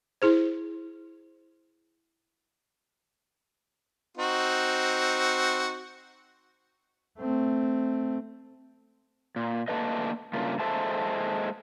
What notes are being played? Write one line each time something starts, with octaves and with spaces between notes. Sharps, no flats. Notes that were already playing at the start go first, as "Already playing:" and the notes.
E4 G#4 C5
C4 D#4 F#4
A3 C4
A#2
A3 A#3 D4 A4 B4 D#5
G2 C#3 A3 A#3 F4
G#3 A#3 A4 C5 E5 A5